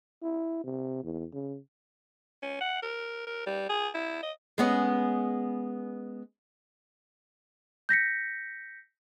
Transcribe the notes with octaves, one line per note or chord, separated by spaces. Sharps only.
E4
C3
E2
C#3
C#4
F#5
A#4
A#4
G3
G#4
E4
D#5
G#3 B3 C#4
G6 A#6 B6 C#7